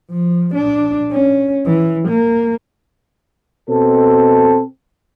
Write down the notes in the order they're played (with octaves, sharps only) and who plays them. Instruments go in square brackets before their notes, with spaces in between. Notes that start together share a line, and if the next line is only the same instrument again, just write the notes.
[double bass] F3
D4
C#4
E3
A#3
[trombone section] B2 C4 A4